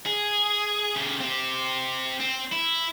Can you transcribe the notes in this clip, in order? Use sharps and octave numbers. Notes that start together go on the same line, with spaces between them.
G#4
C#3 G4
C4 G4
C4
E4